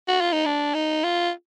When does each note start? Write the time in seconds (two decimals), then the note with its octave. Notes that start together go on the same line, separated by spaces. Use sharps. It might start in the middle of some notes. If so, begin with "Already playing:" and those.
0.07 F#4
0.21 F4
0.32 D#4
0.46 D4
0.74 D#4
1.04 F4